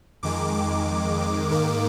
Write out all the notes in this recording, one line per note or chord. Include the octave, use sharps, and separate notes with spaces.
F2 D#3 G#3 D6
D6
D6
G#2 D#3 A#3